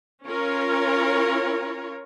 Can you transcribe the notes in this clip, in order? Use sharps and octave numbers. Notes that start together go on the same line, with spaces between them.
C#4 F4 A#4 C#5